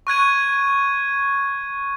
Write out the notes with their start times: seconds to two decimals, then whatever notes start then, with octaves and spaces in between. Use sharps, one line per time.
0.07 C#6 F#6 G#6 D#7